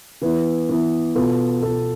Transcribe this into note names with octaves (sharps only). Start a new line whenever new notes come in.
E3 B3 E4
E3 B3 E4
B2 B3 F4 A4
B2 B3 F4 A4